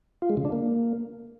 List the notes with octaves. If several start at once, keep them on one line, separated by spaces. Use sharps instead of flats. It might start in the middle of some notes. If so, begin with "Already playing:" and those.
F4
G#3
C#3
D4
A#3